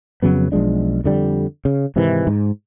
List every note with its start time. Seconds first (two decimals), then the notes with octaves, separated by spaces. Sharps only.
0.22 F2 C#3 F#3 B3
0.52 B1 F3 G#3 D4
1.04 F2 D3 G3
1.65 C#3
1.96 G#2 C3 D#3 E3
2.27 G#2